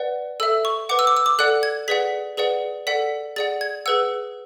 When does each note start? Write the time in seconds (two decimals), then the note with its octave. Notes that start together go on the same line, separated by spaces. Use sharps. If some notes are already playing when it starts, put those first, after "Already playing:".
Already playing: B4 D5 F#5
0.40 A4 E5 E6
0.65 C#6
0.89 B4 F#5 D6
0.99 E6
1.07 D6
1.17 E6
1.26 D6
1.39 A4 D5 F#5 F#6
1.63 G#6
1.88 G#4 B4 D5 F#5 B6
2.37 G#4 B4 D5 F#5
2.87 A4 D5 F#5 B6
3.36 G#4 D5 F#5 A6
3.61 G#6
3.86 G#4 B4 F#5 E6